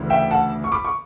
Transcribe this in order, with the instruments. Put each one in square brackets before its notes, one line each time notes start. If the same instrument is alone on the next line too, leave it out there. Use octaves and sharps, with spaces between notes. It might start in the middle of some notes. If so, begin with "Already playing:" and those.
Already playing: [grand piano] D2 C#3 E3
E5 G5
F#5 A5
C#6
B5 D6
C#6